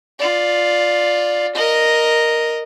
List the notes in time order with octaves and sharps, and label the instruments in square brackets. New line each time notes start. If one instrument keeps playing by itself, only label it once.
[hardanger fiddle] F4 D5
A#4 D#5